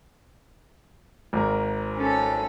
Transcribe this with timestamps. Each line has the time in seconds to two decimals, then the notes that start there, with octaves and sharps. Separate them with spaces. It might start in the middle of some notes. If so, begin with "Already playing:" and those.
1.33 G#1 A#4
1.97 C#4 A4